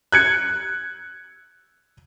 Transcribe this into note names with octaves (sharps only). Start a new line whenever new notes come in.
F#6 G#6 C#7